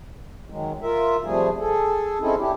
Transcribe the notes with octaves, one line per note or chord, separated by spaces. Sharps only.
D#3 F#3 G#3
F4 A#4 E5
C3 F3 G3 A3 G#4
G#4 A4
C4 C#4 D#4 E4 G#4 A4
D4 E4 G4